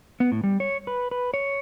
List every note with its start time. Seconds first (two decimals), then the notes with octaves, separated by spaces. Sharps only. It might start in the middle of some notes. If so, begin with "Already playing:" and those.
0.20 B3
0.32 A2
0.44 G3
0.60 C#5
0.87 B4
1.11 B4
1.34 C#5